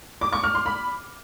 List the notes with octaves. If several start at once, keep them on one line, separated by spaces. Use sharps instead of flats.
D6
C#6
F6
C6
B5